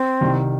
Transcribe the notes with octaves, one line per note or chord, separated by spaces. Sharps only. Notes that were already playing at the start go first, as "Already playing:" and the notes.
Already playing: C4
C2 C3 D#3